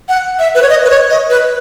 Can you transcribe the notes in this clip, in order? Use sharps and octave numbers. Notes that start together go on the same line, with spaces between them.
F#5
E5
B4
C#5
D#5
B4
C#5
D#5
B4